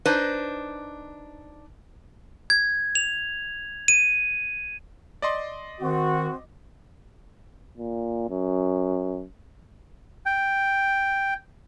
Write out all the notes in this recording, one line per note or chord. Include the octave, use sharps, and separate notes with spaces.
D4 D#4 B4 C5 D#5
G#6
F7
D#7
D5 D#5 C6
D#3 C4 F#4
A#2
F#2
G5